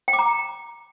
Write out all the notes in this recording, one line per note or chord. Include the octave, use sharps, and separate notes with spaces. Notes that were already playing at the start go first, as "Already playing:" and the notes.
G5
D6
A#5